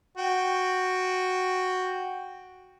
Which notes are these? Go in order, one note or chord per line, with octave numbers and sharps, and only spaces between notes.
F#4 G5